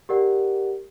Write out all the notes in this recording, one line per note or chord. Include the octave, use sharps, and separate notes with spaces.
G4 A#4 D5 F#5